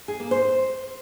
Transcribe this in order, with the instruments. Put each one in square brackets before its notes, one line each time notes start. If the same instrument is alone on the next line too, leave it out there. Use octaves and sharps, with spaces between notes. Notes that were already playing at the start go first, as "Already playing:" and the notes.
[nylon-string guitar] G#4
A#3
C5